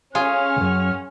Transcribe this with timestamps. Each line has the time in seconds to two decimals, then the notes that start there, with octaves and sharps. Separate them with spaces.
0.15 C#4 F4 G#4 F6
0.56 C#2 F#2